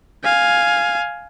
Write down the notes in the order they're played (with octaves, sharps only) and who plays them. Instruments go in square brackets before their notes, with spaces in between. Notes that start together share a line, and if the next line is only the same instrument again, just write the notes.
[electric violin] F5 G#5